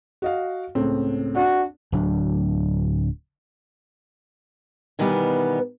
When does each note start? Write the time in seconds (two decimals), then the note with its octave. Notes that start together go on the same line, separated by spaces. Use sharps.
0.22 F#4 D#5 F5
0.75 C#2 A2 C4
1.35 D4 F#4
1.92 D1 D2 F#3 D4
4.99 B2 D#3 E3 G3 B3